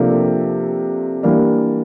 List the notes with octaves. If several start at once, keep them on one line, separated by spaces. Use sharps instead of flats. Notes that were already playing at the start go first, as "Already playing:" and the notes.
Already playing: C3 F3 A#3 D4 A4
E3 G3 A#3 D4